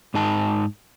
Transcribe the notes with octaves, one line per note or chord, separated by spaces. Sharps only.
G#2 D#4 A5